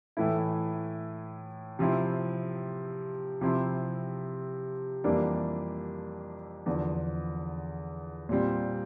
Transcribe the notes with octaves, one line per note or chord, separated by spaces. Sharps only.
A2 E3 A3 E4
C3 F3 C4 E4
C3 F3 C4 E4
F2 E3 G3 A#3 D4
E2 D3 F3
A#2 G3 C4